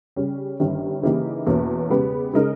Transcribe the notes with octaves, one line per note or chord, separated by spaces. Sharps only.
C#3 G3 C#4
G1 G2 D#3 G3 C#4
C#3 E3 A#3 D#4 G4
E2 B2 A#3 C#4
C#3 G#3 B3 G4 B4
C#3 G#3 D#4 A#4